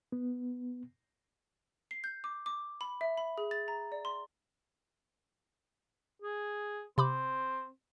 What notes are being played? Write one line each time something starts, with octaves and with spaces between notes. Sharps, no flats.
B3
C7
G6
D6
D6
B5
E5
B5
G#4
A6
A#5
D5
C6
G#4
C3 C4 B5 D6